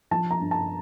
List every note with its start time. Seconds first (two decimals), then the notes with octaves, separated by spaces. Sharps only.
0.11 F3 A5
0.31 A#5
0.41 G2
0.51 A5